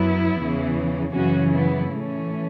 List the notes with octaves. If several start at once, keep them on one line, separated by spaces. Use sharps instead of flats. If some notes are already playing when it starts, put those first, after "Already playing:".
Already playing: F#2 F#3 B3 E4
E2 C#3 E3
F#2 C#3 E3 C#4 F#4
B3 E4
A2 E3 A3 C#4